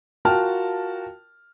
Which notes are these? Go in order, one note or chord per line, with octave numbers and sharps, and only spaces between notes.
F4 F#4 A#4 G5 A5 F6